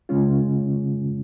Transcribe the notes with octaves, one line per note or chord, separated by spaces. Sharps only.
C#3 G#3 C#4 F4